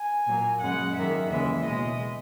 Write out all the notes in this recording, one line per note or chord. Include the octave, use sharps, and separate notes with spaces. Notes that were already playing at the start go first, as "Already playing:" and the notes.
Already playing: G#5
A#2 F#3 A#3
F#2 C#3 G#3 F#5
F#2 D#3 A#3 E5
D#2 C#3 E3 G#3 E5
B2 G#3 D#5